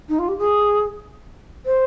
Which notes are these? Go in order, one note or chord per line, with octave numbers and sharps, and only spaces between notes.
D#4
F4
G4
G#4
C5